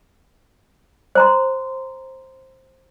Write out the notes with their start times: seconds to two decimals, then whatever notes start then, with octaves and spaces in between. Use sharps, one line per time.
1.15 C5 A#5 C6